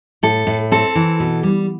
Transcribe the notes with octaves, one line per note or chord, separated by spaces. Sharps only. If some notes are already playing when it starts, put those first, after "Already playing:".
A2 A4
A2
C4 A4
E3
B2
G3